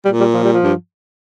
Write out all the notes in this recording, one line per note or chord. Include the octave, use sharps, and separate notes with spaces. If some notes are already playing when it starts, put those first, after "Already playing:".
A#2 G3
G3
F3
G3
F3
G2